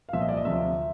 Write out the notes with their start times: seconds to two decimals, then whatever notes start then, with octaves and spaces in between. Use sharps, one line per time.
0.09 F5
0.13 C2 A#2 F3 E5
0.21 D#5
0.29 D5
0.37 D#5
0.45 D2 C3 F3 E5